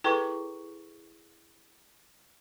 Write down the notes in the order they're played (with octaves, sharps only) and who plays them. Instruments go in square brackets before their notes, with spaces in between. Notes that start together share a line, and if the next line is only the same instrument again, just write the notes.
[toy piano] E4 G#4 C#6 [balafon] A4 B4 G5